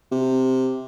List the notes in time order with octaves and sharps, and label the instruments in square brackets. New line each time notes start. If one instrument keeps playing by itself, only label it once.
[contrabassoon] C3